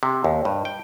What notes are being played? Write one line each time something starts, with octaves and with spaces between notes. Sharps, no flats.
C3
D#2
G2
G5